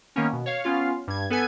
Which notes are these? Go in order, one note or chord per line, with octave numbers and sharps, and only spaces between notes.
D#3 A#3 B3 C#4
B2
C#5 F5
B3 C#4 F4 F5
G2 G#6
B3 A4 B4 G#5 G#6